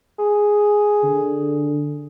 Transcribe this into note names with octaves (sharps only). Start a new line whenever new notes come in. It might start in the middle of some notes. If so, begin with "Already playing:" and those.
G#4
D3